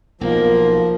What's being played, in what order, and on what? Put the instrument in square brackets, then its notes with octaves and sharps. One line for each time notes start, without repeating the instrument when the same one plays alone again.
[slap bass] B1 [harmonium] F3 [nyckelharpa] A#3